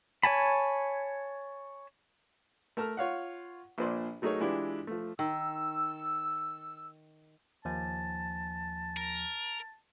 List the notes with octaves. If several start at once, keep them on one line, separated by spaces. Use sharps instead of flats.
C#5 G#5 A5 B5
A3 A#4 A5 A#5 F6
F4 C#5 F5 F#5
A#1 A#2 D4 C5 D5 C6
F#3 A3 D#4 G#4 A#4 C#5
E3 G#3 D4 E4 F4 G4
F3 A3
D#3 E6
D#2 F3 G#5 A5
A#4